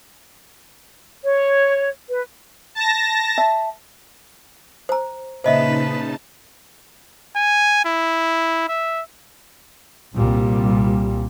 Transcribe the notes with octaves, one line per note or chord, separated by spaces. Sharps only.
C#5
B4
A5 A#6
E5 A5
C5 A#5
A#2 C#3 D#4 B4 C5 D#5 E5 A5
G#5
E4
E5
C2 A#2 G3